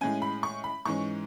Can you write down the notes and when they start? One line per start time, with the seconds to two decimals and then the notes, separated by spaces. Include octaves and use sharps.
0.01 A2 G#3 C#4 G#5
0.22 B5
0.43 C#6
0.64 B5
0.85 G#2 E3 G#3 C#4 C#6